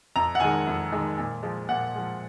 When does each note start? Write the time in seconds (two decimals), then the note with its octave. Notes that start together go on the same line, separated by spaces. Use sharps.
0.16 F2 A#5
0.35 F#5
0.40 D#3 G#3 G#5
0.67 F2
0.92 D#3 G#3
1.18 A#2
1.43 F3 G#3
1.69 A#2 F#5
1.94 F3 G#3